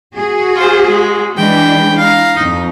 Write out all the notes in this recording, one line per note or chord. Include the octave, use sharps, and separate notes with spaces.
F#4 G#4
F4 C5
G#3
E3 G#3 D4 G5 B5
F5 A#5
F2 D#4